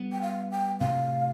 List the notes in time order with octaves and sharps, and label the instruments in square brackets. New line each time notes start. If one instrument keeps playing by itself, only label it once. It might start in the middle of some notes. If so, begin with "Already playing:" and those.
Already playing: [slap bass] G3 B3
[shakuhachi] G5
F5
G5
[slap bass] A2 C3 [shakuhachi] F5